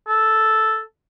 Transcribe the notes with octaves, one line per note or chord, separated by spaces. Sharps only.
A4